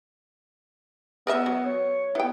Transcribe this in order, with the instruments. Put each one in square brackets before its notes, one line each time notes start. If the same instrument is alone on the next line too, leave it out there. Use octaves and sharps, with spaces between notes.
[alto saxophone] B3 [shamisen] A#4 D#5 E5
[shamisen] F#3
[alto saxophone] C#5
[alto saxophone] B3 [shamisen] E4 G5